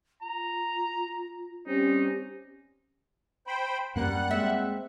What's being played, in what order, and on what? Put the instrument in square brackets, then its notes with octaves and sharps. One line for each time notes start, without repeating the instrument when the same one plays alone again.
[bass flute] F4 [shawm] A#5
[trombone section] G3 C4 C#4 [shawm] D#4 [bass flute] G4
[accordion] C5 G5 B5
[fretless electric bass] F#2 A#3 [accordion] G3 F#5 F#6
[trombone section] G#3 C4 [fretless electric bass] A#3 [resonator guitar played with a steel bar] E5